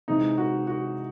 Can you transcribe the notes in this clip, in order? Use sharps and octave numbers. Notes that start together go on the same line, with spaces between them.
C3 E3 G#3 D#4
F#4
F#4